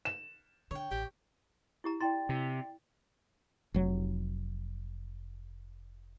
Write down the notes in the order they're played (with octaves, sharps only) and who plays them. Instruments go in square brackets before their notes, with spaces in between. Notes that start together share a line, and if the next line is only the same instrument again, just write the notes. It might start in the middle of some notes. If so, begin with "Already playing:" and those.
[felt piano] E7
[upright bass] D3 [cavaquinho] C#5 G5
[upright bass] A1 [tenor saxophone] G4
[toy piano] E4 G4 A#5
[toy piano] E4 A#5 C6 [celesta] D5 G5 A6
[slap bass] C3
[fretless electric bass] F1 F#3